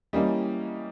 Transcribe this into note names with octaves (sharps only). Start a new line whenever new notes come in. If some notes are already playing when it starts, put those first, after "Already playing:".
E3 G3 A#3 C#4 D#5